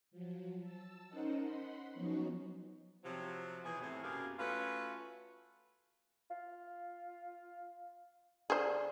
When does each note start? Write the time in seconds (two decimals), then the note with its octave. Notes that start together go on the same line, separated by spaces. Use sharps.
0.11 F3 F#3
0.60 A5 E6
1.09 C#4 D#4 A#4 C5 D#5 F#5
1.41 F#5 B5 C6
1.94 F3 F#3 B3 C#4 D#4 F#4
3.04 C3 F3 F#3
3.65 B2 E3 G#4
3.81 A2 C3
4.03 F#2 B2 A#3 G4 G#4 F5
4.39 A3 C#4 F4 F#4 B4
6.31 F4
8.50 D3 G#4 C5